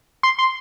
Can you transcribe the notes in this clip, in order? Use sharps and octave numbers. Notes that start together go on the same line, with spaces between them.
C6
C6